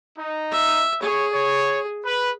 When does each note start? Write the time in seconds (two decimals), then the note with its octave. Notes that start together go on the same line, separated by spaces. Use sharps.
0.18 D#4
0.52 E5
1.02 G#4 C#5
1.33 C#5
2.05 B4